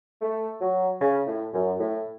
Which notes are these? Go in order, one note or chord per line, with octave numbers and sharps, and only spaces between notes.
A3
F#3
C#3
A2
F#2
A2